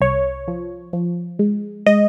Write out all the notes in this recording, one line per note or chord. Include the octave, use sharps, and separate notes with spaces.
C2 C#5
F3
F3
G#3
G#3 D#5